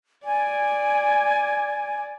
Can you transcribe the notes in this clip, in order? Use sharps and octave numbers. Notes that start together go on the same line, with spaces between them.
D5 G#5